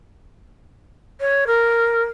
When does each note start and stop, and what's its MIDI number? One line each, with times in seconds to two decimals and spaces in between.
1.20 1.45 73
1.47 2.04 70